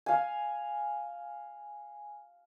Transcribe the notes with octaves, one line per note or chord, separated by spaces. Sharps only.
F5 G#5